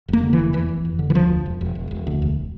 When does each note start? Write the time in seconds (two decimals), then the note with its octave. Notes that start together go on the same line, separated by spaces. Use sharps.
0.08 F1 A#3
0.23 D3
0.33 E3
0.39 F1
0.53 E2 E3
0.69 F1
0.85 F1
0.99 D3
1.10 E3
1.15 D2 F3
1.30 E1
1.46 E1
1.61 E1
1.75 E1
1.91 E1
2.07 D2
2.22 E1